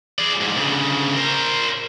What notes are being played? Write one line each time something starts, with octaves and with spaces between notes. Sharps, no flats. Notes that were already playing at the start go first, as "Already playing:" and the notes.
G#4 D5
F2 G#2
D2 C#3
A#4 C5